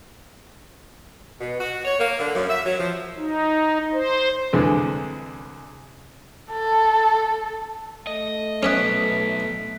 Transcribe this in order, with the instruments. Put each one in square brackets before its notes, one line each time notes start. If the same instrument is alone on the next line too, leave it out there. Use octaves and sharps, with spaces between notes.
[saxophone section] B2
F#4
C#5
A#3
D3
F#2
E5
F#3
F3
[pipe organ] D#4
C5
[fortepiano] C2 D3 E3 G#3
[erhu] A4
[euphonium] A3 [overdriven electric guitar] D#5
[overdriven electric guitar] F#3 B3 [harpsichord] C#4 C#5 D#5 [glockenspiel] F#6 B6 D7